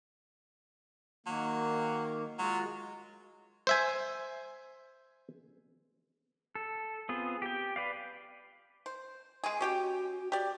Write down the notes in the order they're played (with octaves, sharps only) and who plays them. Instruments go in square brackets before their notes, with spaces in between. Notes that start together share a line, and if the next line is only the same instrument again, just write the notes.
[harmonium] D#3 A#3 [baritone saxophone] F#3
[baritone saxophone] F#3 [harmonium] G#3 F4 F#4
[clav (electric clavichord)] C5 E5 G#5
[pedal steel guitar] A4
B3 C4 F4 G#4
G4 G5
B4 D5 F5
[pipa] C5
G#3 G#4
[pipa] C#4 G4 G5 [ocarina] F#4
[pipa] G4 D5